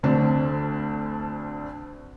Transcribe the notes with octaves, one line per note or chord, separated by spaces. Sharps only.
D2 D3 C4 D4